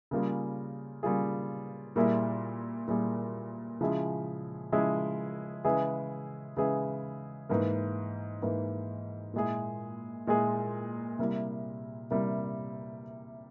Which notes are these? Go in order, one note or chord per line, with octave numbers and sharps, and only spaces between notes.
C#3 G3 A#3 F4 G#4
C#3 G3 A#3 F4 G#4
A#2 G3 A#3 E4 G#4
A#2 G3 A#3 E4 G#4
C#3 F3 G#3 E4 G#4
C#3 F3 G#3 E4 G#4
C#3 E3 G#3 E4 G#4
C#3 E3 G#3 E4 G#4
G#2 E3 A#3
G#2 E3 A#3
A#2 G#3 E4 G#4
A#2 G#3 E4 G#4
C3 G3 A#3 E4
C3 G3 A#3 E4